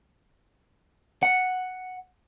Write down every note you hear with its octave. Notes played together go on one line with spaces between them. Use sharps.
F#5